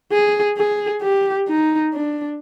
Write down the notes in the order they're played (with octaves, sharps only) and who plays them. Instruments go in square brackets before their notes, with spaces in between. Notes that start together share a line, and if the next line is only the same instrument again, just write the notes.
[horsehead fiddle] G#4
G#4
G4
D#4
D4